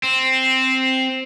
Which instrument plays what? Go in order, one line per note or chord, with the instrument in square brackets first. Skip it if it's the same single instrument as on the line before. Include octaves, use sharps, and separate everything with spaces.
[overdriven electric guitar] C4